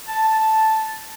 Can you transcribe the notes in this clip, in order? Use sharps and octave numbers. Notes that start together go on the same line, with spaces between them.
A5
A5